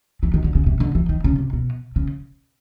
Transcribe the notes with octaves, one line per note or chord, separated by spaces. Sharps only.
E3
D#3
D3
C#3
C3
D3
E3
D#3
C#3
C3
B2
C#3